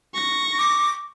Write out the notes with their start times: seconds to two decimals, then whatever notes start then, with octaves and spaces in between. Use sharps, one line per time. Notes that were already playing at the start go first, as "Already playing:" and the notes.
0.14 C#6 A#6
0.59 D6